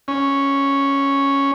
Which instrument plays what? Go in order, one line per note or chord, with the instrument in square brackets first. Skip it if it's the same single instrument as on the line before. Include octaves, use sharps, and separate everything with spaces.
[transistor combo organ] C#4